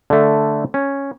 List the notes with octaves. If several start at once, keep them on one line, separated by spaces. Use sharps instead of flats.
D3 A3
C#4